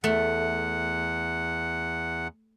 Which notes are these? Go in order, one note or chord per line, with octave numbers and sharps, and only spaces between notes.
E2 A3 F#5